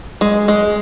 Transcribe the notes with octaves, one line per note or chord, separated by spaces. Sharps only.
G#3
G#3